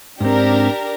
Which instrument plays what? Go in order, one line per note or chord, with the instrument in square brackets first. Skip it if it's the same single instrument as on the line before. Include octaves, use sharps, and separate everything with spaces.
[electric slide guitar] G#2 C4 [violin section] D4 G4 A#4